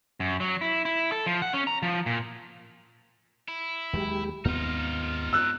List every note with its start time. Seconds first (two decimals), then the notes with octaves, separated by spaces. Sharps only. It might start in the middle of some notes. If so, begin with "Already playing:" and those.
0.20 F#2
0.40 F#3
0.61 E4
0.85 E4
1.12 A4
1.26 F3
1.42 F#5
1.53 C#4
1.67 A#5
1.83 F3
2.06 A#2
3.48 E4
3.93 D#2 F#3 G#3 G4
4.45 D#2 G#2 B3 C4 D#4 F4 F6
5.33 E6 F#6